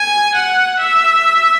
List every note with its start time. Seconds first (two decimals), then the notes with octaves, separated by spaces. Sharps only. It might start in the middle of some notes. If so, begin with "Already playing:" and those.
Already playing: G#5
0.34 F#5
0.79 E5